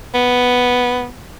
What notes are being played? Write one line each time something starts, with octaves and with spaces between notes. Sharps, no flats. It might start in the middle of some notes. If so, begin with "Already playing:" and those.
B3